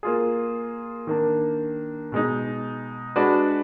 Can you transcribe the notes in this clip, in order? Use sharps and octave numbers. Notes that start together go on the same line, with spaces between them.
A#3 F4 G#4
D#3 A#3 D4
B2 G#3 D#4
G#3 D4 F#4 B4 D5